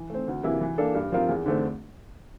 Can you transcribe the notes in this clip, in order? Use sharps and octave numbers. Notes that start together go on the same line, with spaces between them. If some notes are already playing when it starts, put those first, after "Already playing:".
Already playing: E3
A3 C4
D2
C3 E3 A#3 E4
E3
A#3 D4 A4
G2
F3 C4 F4 A#4
E2
D3 A3 C4